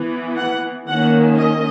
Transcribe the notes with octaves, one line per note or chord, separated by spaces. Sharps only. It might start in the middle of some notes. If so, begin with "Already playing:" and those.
Already playing: E3 B3
F#5
D#3 A#3 C#4 F#5
D#5